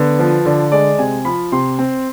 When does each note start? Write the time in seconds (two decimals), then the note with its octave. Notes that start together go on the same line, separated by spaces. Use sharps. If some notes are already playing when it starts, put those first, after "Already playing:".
Already playing: D3 B3
0.19 F3 B4
0.45 D3 D5
0.72 G#3 D5
0.99 C3 G#5
1.25 F3 B5
1.52 C3 C6
1.79 C4